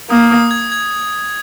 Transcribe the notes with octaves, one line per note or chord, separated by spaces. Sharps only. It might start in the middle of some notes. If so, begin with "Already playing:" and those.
A#3 D#6
D#6
G#6
G#6